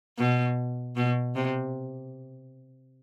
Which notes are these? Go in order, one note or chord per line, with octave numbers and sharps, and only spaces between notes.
B2
B2
C3